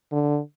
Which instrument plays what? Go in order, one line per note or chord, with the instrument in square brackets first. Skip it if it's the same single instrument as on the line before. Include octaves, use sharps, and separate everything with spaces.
[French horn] D3